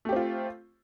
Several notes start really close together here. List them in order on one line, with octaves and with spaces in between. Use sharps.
A3 G4 C4 F4